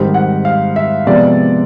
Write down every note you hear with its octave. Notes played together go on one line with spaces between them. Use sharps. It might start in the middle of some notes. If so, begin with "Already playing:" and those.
Already playing: G#2 D#3 G3 C4
F#5
F5
E5
C3 F3 G#3 B3 D5